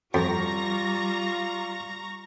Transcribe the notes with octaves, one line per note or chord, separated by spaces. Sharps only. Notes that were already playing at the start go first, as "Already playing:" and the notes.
F2 G3 F4 A#5 C#6 A#6